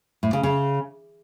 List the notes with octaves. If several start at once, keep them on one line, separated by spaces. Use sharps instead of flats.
A2
C#3
C#3